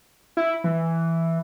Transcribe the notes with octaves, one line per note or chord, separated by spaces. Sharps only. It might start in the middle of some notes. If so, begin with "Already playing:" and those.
E4
E3